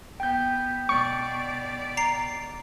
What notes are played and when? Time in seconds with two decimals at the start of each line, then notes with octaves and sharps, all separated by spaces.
0.20 B3 G5 G6
0.89 B2 D5 C#6
1.97 A#5 C7